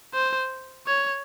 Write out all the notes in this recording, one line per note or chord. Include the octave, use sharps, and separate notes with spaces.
C5
C#5